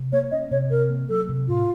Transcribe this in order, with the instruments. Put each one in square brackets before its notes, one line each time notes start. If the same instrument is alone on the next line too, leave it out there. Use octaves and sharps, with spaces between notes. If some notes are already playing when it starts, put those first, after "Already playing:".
Already playing: [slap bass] C3
[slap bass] A#3 [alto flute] C#5
[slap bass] C#4 [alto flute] D#5
[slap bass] C3 [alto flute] C#5
[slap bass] C3 [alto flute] A#4
[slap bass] A#3
[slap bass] F#3 [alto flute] A4
[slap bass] C3
[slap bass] A2 [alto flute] F4